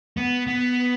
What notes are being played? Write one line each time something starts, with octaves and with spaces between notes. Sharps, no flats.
B3
B3